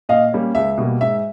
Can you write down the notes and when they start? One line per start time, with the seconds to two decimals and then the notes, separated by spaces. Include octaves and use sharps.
0.09 A#2 D#5 F5
0.33 G3 A#3 C#4
0.55 C#2 E5
0.78 B2 G3 A#3
1.01 G#2 E5